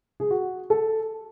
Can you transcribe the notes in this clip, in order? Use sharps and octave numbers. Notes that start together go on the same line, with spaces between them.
G#4
F#4
A4